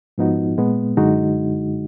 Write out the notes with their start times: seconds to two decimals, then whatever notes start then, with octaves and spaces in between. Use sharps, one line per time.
0.18 G#2 F3 B3 D#4 F#4
0.57 A#2 G#3 B3
0.97 F#2 D3 G#3 D#4 F#4